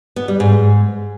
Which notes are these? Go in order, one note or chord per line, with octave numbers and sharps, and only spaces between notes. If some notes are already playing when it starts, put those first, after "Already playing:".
B3
G3
G#2